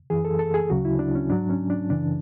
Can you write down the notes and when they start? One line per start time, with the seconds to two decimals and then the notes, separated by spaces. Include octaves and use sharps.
0.10 F#2 E3 G#4
0.25 A4
0.39 A4
0.54 G#4
0.70 D2 C#3 F#3 F#4
0.85 E4
0.99 D4
1.15 C#4
1.30 G#2 F#3 D4
1.50 C#4
1.70 D4
1.90 F#2 C#3 E3 D4